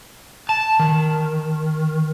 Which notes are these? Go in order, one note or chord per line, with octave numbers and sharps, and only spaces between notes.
A5
D#3